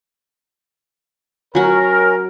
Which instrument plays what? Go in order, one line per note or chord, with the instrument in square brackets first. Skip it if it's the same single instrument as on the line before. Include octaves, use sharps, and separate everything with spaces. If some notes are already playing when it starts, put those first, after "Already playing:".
[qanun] F#3 F#4 [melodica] C#4 [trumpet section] A#4